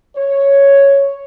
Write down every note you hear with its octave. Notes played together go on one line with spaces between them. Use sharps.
C#5